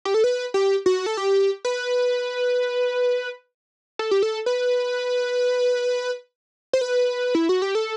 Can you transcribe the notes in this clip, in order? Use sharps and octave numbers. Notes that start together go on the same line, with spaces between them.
G4
A4
B4
G4
F#4
A4
G4
B4
A4
G4
A4
B4
C5
B4
E4
F#4
G4
A4